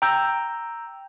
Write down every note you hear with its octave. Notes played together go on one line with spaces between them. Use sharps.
G5 A#5 E6 G6